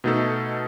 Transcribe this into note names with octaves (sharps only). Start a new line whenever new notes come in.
B2 A3 D#4 A4